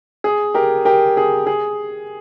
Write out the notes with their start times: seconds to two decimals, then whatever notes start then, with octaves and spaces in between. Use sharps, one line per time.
0.24 G#4
0.54 G4 A#4
0.85 G4 A#4
1.17 G#4
1.47 G#4